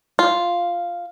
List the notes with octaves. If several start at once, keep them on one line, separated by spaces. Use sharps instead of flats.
F4